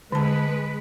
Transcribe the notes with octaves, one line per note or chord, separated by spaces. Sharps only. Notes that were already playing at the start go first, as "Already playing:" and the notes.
D3 G#3 B4 A5